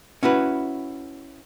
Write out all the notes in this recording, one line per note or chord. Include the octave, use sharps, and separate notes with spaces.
C#4 E4 F#4 B4